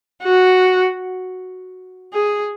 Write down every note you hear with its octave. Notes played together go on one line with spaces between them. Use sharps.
F#4
G#4